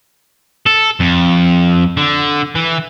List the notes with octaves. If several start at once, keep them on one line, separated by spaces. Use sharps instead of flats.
A4
F2
D3
E3